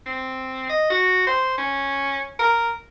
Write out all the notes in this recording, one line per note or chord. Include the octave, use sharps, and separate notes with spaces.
C4
D#5
F#4
C5
C#4
A#4